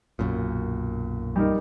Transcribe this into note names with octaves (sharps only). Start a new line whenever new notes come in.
B1 F#2 A#2
G3 D#4 A#4